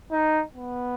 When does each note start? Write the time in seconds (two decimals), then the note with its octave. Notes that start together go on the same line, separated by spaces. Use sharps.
0.12 D#4
0.55 B3